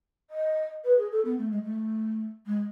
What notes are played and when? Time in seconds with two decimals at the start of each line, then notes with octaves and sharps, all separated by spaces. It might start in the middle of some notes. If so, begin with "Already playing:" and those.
0.30 D#5
0.84 B4
0.98 G#4
1.11 A4
1.25 B3
1.38 A3
1.51 G#3
1.63 A3
2.46 G#3